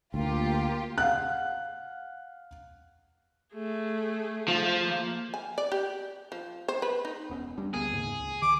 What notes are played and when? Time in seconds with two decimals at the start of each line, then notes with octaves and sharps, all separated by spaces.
0.14 D2 A#3 F4 G4
0.98 F5 F#5 F#6
3.54 A3 G#4
4.48 F3
4.83 A#3
5.34 G#5
5.58 D5
5.72 G4
6.32 F3
6.68 C5
6.82 B4
7.05 D#4
7.30 E1 B3 C#4
7.58 G3 D4
7.74 D2 A#3 B3 G#4
7.92 D#2 G#2 C#3
8.19 C#2
8.42 D#3 D6